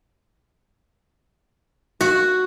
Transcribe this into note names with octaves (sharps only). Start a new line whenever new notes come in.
F#4